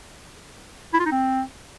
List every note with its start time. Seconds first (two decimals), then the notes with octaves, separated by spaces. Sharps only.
0.94 E4
1.00 F4
1.06 D#4
1.12 C4